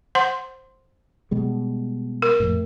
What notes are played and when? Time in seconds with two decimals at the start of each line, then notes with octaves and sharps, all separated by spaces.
0.15 C5 F#5 C6
1.31 B2 G3 G#3
2.22 A#4
2.40 F2 A2